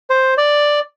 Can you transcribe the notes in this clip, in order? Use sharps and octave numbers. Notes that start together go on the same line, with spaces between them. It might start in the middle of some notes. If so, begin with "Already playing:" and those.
C5
D5